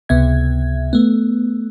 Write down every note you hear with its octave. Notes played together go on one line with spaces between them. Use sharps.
C#2 C3 B3 E5 G#6
A3 B3